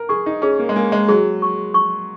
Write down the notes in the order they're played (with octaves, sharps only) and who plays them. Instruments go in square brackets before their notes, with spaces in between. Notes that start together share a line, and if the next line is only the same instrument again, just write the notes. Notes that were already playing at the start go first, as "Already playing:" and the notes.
Already playing: [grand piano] A#4
[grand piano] G#4 [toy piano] C#6
[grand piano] D#4
[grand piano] C#4 [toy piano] G#4
[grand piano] A#3
G#3
[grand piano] A#3 [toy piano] G#5
[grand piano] G#3
[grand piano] F#3 [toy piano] G#4
[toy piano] C#6
C#6